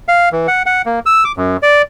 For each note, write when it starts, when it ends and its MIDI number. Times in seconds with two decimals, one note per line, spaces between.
0.08 0.29 77
0.32 0.47 52
0.48 0.63 78
0.66 0.82 78
0.86 0.99 58
1.06 1.24 88
1.25 1.32 86
1.37 1.57 42
1.62 1.82 74